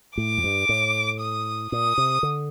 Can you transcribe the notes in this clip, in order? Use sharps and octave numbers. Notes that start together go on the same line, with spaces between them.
A2 D6
F2
G2
A2
D#6
A#2 D#6
C3
D3